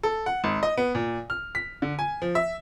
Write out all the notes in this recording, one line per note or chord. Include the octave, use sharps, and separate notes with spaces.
A4
F#5
G#1
D#5
B3
A#2
F6
B6
D3
G#5
F3
E5